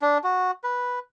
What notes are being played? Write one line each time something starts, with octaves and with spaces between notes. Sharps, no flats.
D4
F#4
B4